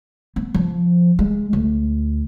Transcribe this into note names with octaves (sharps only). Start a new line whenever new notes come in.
B3
F3
G#3
D2